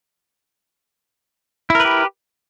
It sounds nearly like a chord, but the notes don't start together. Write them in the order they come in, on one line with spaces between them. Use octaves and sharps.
E4 A#4 B4 G4